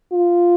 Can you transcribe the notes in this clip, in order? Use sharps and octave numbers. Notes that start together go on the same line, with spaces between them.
F4